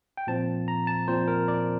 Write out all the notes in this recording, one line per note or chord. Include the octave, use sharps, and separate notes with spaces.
G5
A#2 F3 C4 A5
A#5
A5
A#2 F3 C4 C5
A#4
D5